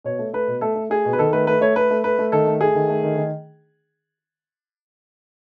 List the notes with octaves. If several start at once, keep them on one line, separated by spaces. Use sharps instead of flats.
B2 C#5
A3
A3 B4
B2
A3 A4
A3
A3 G#4
B2
B4
D#3 A4
A3 B4
A3 B4
A3 C#5
A3 B4
A3
A3 B4
A3
D#3 A4
A3
A3 G#4
D#3
A3
D#3
D#3